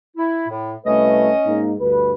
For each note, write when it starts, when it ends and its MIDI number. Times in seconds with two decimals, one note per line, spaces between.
0.17 0.47 64
0.49 0.74 45
0.86 1.30 36
0.86 1.30 57
0.86 1.65 61
0.86 1.30 71
0.86 1.65 75
1.46 1.73 44
1.46 1.73 58
1.46 1.73 63
1.80 2.14 38
1.80 2.14 43
1.80 2.14 71